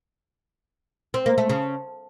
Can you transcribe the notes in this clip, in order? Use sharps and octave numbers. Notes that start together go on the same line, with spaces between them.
C4
A#3
A3
C#3